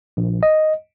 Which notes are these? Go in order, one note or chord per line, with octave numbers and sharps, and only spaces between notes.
A#1
D#5